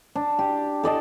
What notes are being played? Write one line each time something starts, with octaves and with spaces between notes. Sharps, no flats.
D4
G4
A4 D5 D#5 A5